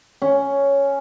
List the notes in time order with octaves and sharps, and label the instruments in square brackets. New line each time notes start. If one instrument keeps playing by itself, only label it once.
[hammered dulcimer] C#4